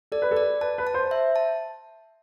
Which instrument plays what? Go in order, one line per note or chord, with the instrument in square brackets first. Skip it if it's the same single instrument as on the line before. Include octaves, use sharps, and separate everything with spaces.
[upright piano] A4 [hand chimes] D5
[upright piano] B4
A4
[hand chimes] D5
[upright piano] B4 [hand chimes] A5
[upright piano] B4
[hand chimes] A5
[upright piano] C5
[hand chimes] E5
A5